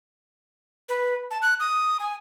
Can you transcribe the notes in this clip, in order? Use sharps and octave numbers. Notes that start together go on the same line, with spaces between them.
B4
A5
F#6
D#6
G#5